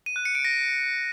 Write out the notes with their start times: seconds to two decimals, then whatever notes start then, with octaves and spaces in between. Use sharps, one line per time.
0.06 D#7
0.16 F#6
0.25 C#7
0.35 D7
0.45 A#6